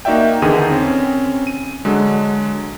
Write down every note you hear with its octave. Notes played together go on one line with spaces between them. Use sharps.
A#3 D#4 F#4 D5 E5 G5
E2 D3 D#3 G#4 G5 D#7
C4 C#4
D#7
D3 F#3 G#3